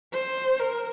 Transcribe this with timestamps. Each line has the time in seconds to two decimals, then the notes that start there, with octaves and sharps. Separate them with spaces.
0.14 C5
0.59 A#4